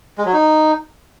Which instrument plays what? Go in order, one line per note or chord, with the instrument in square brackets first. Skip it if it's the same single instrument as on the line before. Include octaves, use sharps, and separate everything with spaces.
[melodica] G#3
F#3
D#4